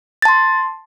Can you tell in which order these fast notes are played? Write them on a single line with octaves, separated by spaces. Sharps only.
A6 A5 C6